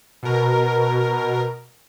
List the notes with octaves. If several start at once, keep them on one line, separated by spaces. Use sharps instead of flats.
B2 A#4